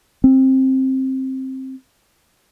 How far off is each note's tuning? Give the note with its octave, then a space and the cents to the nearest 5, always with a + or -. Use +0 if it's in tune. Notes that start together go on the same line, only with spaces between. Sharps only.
C4 +15